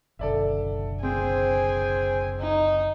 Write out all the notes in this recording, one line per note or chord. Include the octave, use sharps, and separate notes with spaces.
F#1 B1 D3 A4 D5 E5
C4 G#4 C5 G5 G#5
D#4